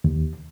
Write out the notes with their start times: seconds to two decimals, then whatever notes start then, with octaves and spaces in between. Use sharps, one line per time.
0.04 D#2